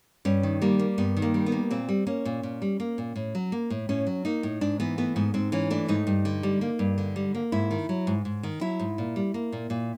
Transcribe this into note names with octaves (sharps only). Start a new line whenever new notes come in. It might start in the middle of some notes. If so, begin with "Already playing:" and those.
G2 C#4
D#3
G3 A#3
A#3
G2 B3
D#3
A#3
G3
B3
A#3
A#2 C4
G3
A#3 C#4
A#2
A#2
G3
A#3
A#2
A2
F#3
A#3
A2
A2 C#4
F#3
A#3 D#4
A2
G#2 D4
E3 B3
A3 B3
G#2 B3
G#2 C4
E3 C#4
A3 D4
G#2 D#4
G2
D3
G3
A#3
G2
D3
G3
A#3
G#2 E4
D#3
F#3
G#2
G#2
D#3
F#3 E4
G#2
A#2
G3
A#3
A#2
A#2